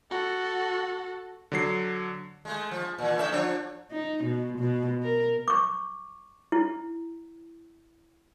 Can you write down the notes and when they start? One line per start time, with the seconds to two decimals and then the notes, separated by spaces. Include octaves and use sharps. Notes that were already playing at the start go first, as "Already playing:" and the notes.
0.11 F#4 A4
1.52 D3 F#3 C7
2.45 G#3 A3
2.71 F3
2.98 A#2 E3
3.18 A2 D3 E5
3.32 F3 D4 C#5
3.92 D#4
4.24 B2
4.58 B2
5.03 A#4
5.48 C#6 D6
6.52 E4